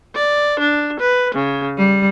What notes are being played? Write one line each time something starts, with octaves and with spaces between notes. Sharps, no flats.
D5
D4
B4
C#3
G3